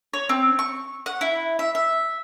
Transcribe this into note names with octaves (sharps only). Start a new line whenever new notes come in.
C#5
C4
C#6
F#5
E4
E5
E5